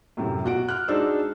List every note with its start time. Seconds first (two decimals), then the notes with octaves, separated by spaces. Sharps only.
0.17 F#2 A2 C3
0.44 B2 F#4 F#5 D7
0.68 F6 F#6
0.88 G#3 D4 D#4 F#4 C5 E6